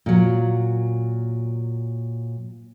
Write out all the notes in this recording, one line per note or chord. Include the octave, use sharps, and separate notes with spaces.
A#2 F#3